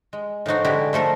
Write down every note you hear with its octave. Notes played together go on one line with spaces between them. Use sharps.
G#3
A2 F3 D#4 F#4
D3 G#3 E4 F#4 G4
F3 A3 A4 A#4